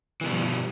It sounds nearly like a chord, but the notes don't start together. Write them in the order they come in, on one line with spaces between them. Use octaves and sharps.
E3 B2 G3 F3 G2